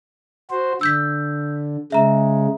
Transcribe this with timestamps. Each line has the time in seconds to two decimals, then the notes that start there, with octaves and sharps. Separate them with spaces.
0.50 F#4 C5
0.81 D3 E6 G6 B6
1.92 C#3 G#3 E5 A#5